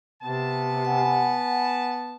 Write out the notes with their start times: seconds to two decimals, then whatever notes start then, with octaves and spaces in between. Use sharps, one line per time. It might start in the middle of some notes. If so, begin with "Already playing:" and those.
0.23 C3 B3 A5
0.85 F#5 G#5 B5